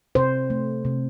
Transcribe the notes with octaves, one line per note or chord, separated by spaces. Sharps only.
C3 C5
A3
C3